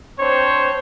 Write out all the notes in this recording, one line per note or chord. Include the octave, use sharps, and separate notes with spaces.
C4 D4 C5 C#5